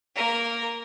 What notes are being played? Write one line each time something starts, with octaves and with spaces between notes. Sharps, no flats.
A#3 A#4